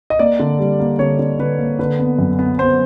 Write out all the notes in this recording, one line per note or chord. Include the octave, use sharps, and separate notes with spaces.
D#5
A#3 D5
D3
G3
A#3
D3 C#5
D3
D3 B4
A#3
D3 B4
B3
F#2
B3
B3 C5